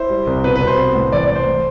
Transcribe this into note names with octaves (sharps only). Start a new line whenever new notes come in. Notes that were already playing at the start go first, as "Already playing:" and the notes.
Already playing: E4 C5
G3
C2
B2 B4
B4
C2
C5
B3
A2
E3 D5
D5
A2
C5
A3